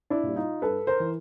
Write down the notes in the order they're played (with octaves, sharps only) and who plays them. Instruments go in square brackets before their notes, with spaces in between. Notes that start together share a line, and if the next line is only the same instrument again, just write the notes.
[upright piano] D4 E4
A#2 G3
D#4 F4
G2 A4 B4
A#4 C5
E3